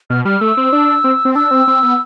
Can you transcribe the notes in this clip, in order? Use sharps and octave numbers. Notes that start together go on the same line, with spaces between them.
B2 F6
G3 F6
A3 E6
C4
D4
C4
C4
D4 E6
C4
C4
B3